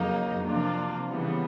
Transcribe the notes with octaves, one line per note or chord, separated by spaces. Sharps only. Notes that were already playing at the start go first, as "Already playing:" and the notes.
Already playing: F2 C#3 F#3 A#3 D#4
C3 F3 A#3 D4 F4
C#3 E3 G3 B3